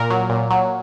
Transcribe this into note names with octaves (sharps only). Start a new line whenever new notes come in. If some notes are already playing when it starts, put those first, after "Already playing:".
Already playing: A#2 A#4
F#3
A#2
F#3